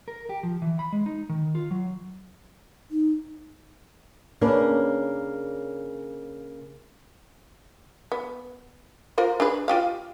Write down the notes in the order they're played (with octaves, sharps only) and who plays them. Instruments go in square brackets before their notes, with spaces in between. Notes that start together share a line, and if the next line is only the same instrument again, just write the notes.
[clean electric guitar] A#4
G4
F3
E3
B5
G#3
D#4
D#3
F4
F#3
[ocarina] D#4
[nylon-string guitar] C#3 A#3 C#4 D4 A#4 B4
[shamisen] B3
F4 A#4 C5
D4 G#4 B4
F4 G4 F5